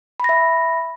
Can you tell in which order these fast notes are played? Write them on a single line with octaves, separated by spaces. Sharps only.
B5 A#6 E5